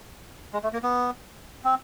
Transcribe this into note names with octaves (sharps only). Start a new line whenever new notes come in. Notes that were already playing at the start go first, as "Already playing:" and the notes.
G#3
A3
A#3
B3
C4